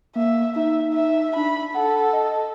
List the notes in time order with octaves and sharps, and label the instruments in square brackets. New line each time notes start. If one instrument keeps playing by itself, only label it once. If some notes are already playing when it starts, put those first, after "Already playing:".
[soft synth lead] A#3 [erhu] E5
[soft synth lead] D#4 [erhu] E5
[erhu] E5
[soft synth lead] D4 [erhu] B5
[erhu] A4 [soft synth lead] F#5
[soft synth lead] D#5